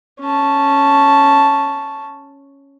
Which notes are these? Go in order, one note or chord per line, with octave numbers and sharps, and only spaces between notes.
C#4 A5